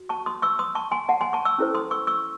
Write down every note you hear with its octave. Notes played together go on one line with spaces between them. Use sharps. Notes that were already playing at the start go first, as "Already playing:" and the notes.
Already playing: F#4
A5 C#6
C6 D#6
C#6 E6
C6 D#6
A5 C#6
G#5 C6
F#5 A5
G#5 C6
A5 C#6
C#6 E6
C#4 E4 A4 C5
C6 D#6
C#6 E6
C#6 E6